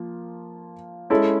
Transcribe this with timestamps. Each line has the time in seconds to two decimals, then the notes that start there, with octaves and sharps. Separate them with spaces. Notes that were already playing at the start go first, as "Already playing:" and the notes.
Already playing: F3 A#3 F4
1.10 G#3 C#4 E4 A4